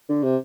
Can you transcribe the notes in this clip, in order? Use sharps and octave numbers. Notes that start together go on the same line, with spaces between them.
D3
C3